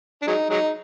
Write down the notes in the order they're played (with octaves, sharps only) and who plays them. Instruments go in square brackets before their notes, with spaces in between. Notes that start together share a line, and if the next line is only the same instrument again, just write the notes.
[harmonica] D4
F#3 G#3 D#4
F#3 G#3 D#4